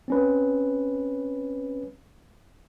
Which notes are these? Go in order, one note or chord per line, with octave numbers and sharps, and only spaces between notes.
C4 C#4 B4